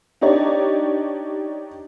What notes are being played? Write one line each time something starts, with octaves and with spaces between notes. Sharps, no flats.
D4 D#4 G4 C#5 D5